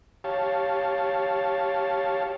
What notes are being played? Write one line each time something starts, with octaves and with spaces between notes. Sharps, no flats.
G4 C#5 F5 A5